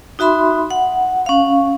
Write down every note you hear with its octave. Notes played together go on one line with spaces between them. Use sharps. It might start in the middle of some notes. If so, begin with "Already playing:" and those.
D#4 F#4 E5 B5 C6
F#5
C#4 F5